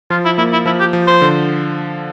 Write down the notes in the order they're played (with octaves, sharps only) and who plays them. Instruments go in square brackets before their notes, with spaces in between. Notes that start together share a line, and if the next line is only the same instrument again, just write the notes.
[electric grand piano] F3 [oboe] F4
[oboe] E4
[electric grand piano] A#3 [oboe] E4
[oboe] E4
[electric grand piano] F3 [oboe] E4
[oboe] G4
[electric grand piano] F3
[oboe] C5
[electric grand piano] D3